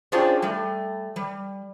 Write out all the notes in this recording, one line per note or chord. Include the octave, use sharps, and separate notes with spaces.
C#4 D4 F4 G4 G#4 C5
G3 A3
G3